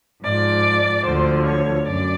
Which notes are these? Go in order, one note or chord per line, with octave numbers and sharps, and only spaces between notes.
G#2 F3 D5
D2 D3 F3 C5
C#5
F#2 D5